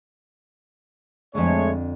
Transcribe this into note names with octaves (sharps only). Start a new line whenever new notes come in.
F2 D3 G#3 A3 C#5